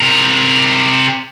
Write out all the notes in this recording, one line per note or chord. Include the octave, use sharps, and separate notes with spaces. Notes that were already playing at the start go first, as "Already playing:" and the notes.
C3 A#4